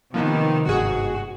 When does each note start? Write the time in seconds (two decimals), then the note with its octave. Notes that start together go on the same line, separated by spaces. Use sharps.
0.14 C3 D#3 F3 A#3 B3
0.68 G1 G#2 F#4 G#4